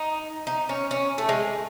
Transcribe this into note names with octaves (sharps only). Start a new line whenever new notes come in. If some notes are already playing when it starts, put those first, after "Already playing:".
Already playing: D#4
D#4
C#4
C#4
A3
G#3